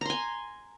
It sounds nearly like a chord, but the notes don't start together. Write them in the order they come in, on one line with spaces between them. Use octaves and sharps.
A#5 C6 G#5